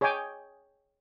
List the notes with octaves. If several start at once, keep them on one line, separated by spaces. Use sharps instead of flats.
G#4 C#5 D#5 G5 G#5 D6